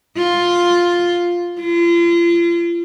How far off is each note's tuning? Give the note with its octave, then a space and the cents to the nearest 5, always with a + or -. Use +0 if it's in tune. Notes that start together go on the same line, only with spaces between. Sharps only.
F4 +5
F4 -35